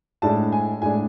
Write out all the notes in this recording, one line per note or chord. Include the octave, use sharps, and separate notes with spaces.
A2 G#3 D4 A5
G#5
A2 G#3 D4 G#5